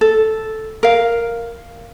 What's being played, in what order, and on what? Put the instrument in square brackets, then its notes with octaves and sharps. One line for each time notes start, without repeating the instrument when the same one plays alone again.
[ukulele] A4
A#4 F5